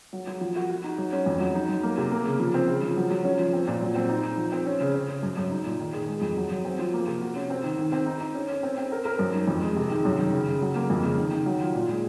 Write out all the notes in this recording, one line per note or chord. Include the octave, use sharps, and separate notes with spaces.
F#3
F#3
F3
F#4
F#4
D#4
F#3
C#4
F2
F#3
D#4
F#3
A#3
C3
A#3
C#3
F3
C4
C#3
F3
F#3
F#3
C#4
F3
C4
A#2
F#3
C4
D#4
D#4
F3
C4
C#4
C#3
C#4
G#4
F#2
F#2
D#4
A#2
D#3
G#4
G#3
F2
F#3
F#3
C4
F3
A#3
C3
F#4
C#4
C4
D#3
D#3
C4
D#4
D#4
C#4
C#4
C4
C4
A#4
A#4
F#2
D#4
F2
G#3
C3
D#3
F#2
D#3
C#3
C#3
F#3
A#3
F2
C#3
D#3
D#3
F#3
F4
A#2
G#3